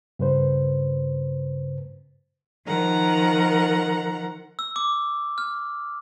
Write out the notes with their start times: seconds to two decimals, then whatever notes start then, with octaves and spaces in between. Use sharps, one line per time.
0.19 G2 C#3 B4 C5
2.66 D#3 F3 A#4 F#5 A#5
4.59 E6
4.76 D6
5.38 F6